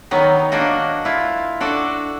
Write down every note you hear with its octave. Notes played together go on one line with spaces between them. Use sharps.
D#3 F#3 B3 D#4
A#3 D4 F#4 D#5
E4 F4
D4 F#4 A4